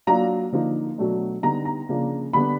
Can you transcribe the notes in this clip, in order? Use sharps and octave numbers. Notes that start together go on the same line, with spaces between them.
F#3 A#3 D4 F4 A#5
D3 F3 A#3 D#4
B2 F#3 A3 D4
D3 G3 B3 D#4 A#5
A#5
C#3 F3 A#3 D4 F4
D3 G3 B3 D4 B5